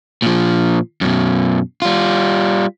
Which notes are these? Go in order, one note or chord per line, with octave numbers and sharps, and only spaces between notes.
A#2 F3
F#2 B2
G3 F4